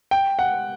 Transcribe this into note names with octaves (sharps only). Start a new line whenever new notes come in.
G5
F#5